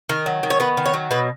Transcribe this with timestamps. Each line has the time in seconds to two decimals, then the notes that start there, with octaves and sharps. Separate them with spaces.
0.09 D#3 A#4
0.26 F#3
0.43 D#3
0.50 C#5
0.60 B3 B4
0.77 D#3
0.86 C#5
0.94 F#3
1.11 B2 B4